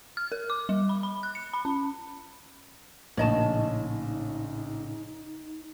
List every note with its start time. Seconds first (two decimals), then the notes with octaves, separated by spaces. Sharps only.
0.17 F6
0.32 A#4
0.50 D6
0.69 G3
0.89 B5
1.03 B5
1.23 F#6
1.35 C#7
1.53 B5
1.65 C#4
3.17 A#1 A2 C#3 D#4 C#5 D#5 A5